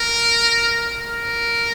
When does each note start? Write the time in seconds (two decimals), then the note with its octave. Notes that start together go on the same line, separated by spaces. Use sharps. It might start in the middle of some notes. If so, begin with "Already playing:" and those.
Already playing: A#4
0.99 A#4